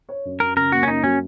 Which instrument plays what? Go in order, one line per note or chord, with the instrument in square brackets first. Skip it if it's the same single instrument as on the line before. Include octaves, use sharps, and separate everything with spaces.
[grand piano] C#5
F#2
[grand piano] F#2 [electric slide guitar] A#4
[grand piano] C#3 [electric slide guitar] A#4
[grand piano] A#3 [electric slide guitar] F#4
[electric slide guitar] C#4
[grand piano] F#2 [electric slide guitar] D#4
[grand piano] F#3 [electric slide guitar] C#4